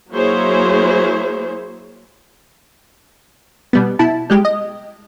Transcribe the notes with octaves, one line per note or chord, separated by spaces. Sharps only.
F#3 A#3 E4 G#4 C5 C#5
B2 G3 B3
B2 E4 A5
G3 G#3 G4
D#5